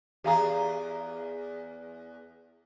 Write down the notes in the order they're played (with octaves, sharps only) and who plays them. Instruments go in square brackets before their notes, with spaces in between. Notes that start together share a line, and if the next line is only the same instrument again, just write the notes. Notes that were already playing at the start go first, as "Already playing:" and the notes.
[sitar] E2 G#4 [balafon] G4 F5 A#5